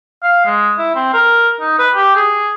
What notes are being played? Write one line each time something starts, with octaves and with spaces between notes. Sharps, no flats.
F5
G#3
E4
C4
A#4
D#4
B4
G4
G#4